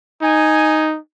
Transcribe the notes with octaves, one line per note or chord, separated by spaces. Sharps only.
D#4 G#5